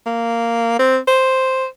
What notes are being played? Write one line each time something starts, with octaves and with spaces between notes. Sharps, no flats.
A#3
C4
C5